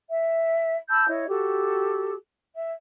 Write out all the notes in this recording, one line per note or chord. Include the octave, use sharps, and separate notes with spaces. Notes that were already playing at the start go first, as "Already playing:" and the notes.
E5
A5 B5 E6 G6
E4 C#5 D#5
F#4 G4 A4
E5